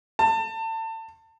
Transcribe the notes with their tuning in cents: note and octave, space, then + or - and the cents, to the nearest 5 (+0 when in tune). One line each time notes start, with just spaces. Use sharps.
A5 +30